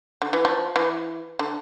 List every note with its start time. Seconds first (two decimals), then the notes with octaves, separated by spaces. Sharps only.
0.22 D3
0.33 E3
0.45 F3
0.76 E3
1.39 D3